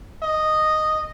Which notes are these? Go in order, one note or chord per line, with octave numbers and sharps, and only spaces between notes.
D#5